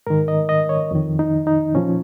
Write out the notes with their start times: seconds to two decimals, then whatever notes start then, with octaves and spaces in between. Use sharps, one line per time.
0.07 G#2 D#3 A#4
0.28 D#5
0.49 D#5
0.69 C#5
0.91 F2 D#3
1.19 D#4
1.47 D#4
1.75 A#2 F3 C#4